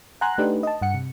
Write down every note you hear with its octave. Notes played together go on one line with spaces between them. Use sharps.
F#5 G#5 A#5 C6 F#6
A3 D4 D#4 G4 B4
D#5 A5
G2 F#5 C#7
C3